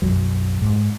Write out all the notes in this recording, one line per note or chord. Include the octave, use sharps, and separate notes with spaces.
B1 F#2 F#3
G#2